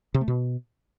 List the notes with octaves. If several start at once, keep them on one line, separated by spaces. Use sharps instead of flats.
C3
A3
B2